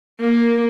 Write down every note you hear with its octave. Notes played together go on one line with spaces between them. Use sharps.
A#3